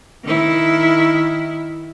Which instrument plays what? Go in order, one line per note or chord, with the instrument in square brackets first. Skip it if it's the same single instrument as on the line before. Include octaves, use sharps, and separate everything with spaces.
[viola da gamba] D#3 E4